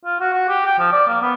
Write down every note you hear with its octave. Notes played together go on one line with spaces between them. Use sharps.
F4
F#4
F#4
G4
G5
F3
D5
A#3
B3